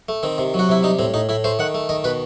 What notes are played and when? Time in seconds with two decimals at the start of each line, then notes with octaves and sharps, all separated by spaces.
0.09 A3
0.23 D#3 C4
0.38 C3
0.54 F#3 F#4
0.69 C3 E4
0.83 G3 D#4
0.99 A2 C4
1.14 A2 D#4
1.29 A2 E4
1.44 A3 C5
1.59 D#3 F#5
1.74 A3
1.89 D#3 D#5
2.04 B2 B4